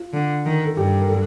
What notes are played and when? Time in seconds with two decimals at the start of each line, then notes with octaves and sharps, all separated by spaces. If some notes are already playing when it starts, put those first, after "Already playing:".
Already playing: F4
0.13 D3
0.46 D#3
0.66 A4
0.77 G2 G4
1.00 A#4
1.08 A4